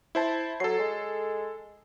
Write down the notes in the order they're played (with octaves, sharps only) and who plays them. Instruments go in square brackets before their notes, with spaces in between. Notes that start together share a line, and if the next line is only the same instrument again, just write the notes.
[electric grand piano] E4 C5 A5
[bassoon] F#3 [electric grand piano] A4 C7
[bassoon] G#3